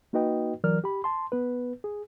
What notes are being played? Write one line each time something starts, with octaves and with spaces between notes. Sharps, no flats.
A#3 D#4 F#4 B4 D#5 G5
E3 F#3 A#4 D5 F6
G4 B5
A5 C6
B3 B4
G#4